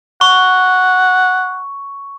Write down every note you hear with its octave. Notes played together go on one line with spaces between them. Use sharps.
F#5 C#6